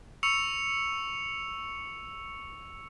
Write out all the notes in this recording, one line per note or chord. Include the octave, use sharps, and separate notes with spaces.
C#6 E6 C#7 F7